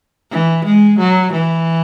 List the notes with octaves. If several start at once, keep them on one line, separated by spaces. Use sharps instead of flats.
E3
G#3
F#3
E3